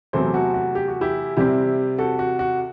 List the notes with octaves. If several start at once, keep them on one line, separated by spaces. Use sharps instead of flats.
E2 C3 F#3 A3 C4 A4 C5
F#4 A4
F#4
G4
F#4
E4 G4
C3 G3 C4 E4 G4
F#4 A4
F#4
F#4